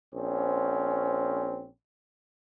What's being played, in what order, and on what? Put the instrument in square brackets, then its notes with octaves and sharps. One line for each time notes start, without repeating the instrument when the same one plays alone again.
[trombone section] A#1 C4 C#4